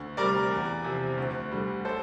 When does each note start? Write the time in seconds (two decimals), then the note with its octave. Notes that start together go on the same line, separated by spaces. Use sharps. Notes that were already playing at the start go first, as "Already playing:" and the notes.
Already playing: D2
0.17 C3 G3 A#4 D5
0.51 E2
0.84 C3 F3
1.17 D2
1.52 D3 G3
1.85 A4 C5